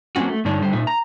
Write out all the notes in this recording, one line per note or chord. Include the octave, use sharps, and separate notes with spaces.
F#3 A#3 C4 C#4 F#4
A3
G2 D3 D4 D#4 C#5
D3 G3 C5
A#2 D#4 E5
A#5